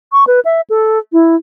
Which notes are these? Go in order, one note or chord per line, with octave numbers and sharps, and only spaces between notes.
C#6
B4
E5
A4
E4